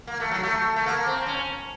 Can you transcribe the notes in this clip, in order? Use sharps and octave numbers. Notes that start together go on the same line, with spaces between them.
A#3
A3
F#3
A3
A3
A#3
C4
C#4